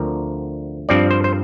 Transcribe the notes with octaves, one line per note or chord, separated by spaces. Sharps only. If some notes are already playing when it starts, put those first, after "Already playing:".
Already playing: D2 D3 F3 C4 A#4
G2 F3 C4 D5
C5
C5